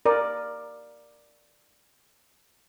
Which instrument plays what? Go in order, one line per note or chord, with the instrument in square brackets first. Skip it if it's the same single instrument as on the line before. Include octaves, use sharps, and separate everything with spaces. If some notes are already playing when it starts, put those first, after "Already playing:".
[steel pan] A#4 D5